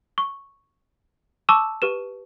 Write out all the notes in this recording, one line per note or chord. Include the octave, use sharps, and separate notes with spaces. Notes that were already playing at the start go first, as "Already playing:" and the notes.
C#6
A5 C#6 D6 E6 E7
G4 B4 E7